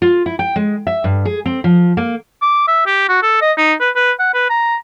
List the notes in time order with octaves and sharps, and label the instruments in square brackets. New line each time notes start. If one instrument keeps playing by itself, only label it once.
[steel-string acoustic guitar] F4
E4
G5
G#3
E5
G2
G#4
C4
F3
A#3
[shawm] D6
E5
G4
F#4
A4
D#5
D#4
B4
B4
F#5
B4
A#5